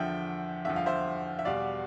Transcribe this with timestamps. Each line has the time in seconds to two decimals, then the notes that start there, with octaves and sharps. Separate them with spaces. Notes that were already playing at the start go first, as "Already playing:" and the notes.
Already playing: E2 D3 F3 E5 G5
0.64 E2 D3 F3 E5
0.76 F5
0.86 C5 E5
1.39 E5
1.45 E2 B2 G3 D5 F5